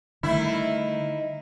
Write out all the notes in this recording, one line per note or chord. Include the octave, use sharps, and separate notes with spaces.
D3 D#3 G3 A3 E4